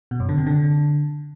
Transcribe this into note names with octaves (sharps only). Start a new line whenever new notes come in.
B2
F#2
D3
C3
D3